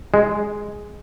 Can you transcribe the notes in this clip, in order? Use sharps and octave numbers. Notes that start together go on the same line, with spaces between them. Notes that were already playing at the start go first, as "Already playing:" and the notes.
G#3